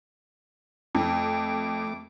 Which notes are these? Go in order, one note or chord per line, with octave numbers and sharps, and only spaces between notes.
F2 A3 D6